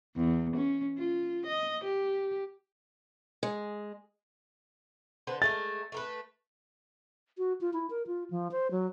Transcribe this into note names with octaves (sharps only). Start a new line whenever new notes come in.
E2
C#4
F4
D#5
G4
G#3
D3 B4 C5
G#3 A3 A#4 A6
A3 A#4 B4
F#4
F4
E4
A#4
F4
F3
C5
F#3